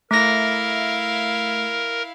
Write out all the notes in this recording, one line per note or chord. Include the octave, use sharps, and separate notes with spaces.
A3 E4 A#4 F5 A#6